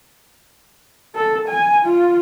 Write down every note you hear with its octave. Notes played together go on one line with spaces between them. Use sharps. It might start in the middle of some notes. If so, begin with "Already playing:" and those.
A4
G#5
F4